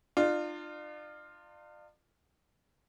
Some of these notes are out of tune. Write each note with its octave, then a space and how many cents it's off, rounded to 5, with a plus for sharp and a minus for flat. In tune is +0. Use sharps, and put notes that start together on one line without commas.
D4 +45 F4 +0